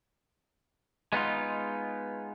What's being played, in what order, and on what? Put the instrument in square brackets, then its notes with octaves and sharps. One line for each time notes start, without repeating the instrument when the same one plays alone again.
[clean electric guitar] G#3 B3 D#4 F4